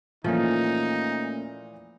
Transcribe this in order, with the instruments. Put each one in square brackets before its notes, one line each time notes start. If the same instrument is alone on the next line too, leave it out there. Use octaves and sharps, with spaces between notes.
[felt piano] A#2 E3 [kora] F3 [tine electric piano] A3 A#3 C#4 [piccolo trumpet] D#4